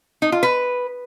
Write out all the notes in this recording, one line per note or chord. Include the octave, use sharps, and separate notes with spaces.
D#4
F4
B4